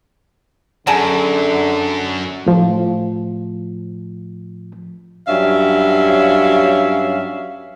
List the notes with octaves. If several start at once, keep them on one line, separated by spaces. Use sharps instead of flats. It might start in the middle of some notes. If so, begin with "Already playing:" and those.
F#2 D3 G#4 A5 A#5
A2 F3
G2 F#3 C#4 E5 F5